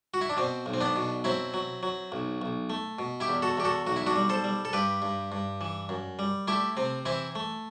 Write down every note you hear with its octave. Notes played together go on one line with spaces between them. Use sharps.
F#4
E4
D4
B2 C4
B1
C4
B3 D4
B2
F#3 C4 E4
F#3
F#3
B1
B1
A3
B2
E4 G4
E2
F#4 A4
E2 G4
F#4 A4
B1 F#4
E4
D4 F#4
G3
A4 C5
G3
A4
G2 G4 B4
G2
G2
E3
F#2
G3
A3 E4 G4
C3 C4
E3 C4 E4
A3